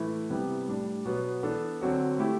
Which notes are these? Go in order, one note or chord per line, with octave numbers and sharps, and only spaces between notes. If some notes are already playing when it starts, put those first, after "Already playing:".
Already playing: A2 E3 A3 E4
C3 G3 B3 E4 G4
A2 G3 D4
B2 F#3 B3
E3 B3 D4 A4
D3 F#3 C4 F#4
A3 E4 G4